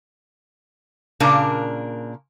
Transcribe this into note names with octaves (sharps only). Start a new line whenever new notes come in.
A#2 C#3 A#3 D4 A#5